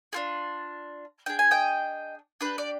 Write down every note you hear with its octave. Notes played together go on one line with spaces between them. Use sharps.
D4 F4 G#4
D4 G#4 G5
G#5
D#5 G5
D4 G4 B4
D5